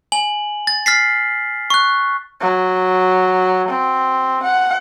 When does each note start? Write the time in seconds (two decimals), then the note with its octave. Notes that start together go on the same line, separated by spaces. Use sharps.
0.12 G#5 F#7
0.67 A6
0.86 F6 A6 B6 C7
1.70 C#6 F#6
2.41 F#3
3.68 C4
4.43 F#5